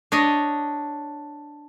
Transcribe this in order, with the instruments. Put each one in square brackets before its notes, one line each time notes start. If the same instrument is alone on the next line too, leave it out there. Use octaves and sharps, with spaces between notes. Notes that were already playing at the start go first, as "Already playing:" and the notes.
[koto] D4 C#5 D#5